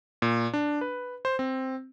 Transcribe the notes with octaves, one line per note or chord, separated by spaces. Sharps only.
A#2
D4
B4
C5
C4